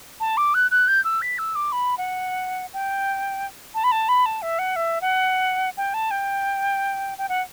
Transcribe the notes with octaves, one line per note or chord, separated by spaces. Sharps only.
A5
D6
F#6
F#6
G6
E6
B6
E6
D6
B5
F#5
G5
A5
B5
A5
B5
A5
E5
F#5
E5
F#5
G5
A5
G5
G5
F#5